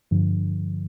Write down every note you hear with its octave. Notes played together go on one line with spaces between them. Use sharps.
G2 D3 F3